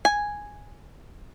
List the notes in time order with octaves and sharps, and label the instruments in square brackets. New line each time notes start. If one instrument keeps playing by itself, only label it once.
[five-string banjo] G#5